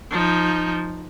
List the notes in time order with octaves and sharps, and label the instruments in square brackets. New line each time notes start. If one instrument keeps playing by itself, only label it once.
[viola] F3 D#4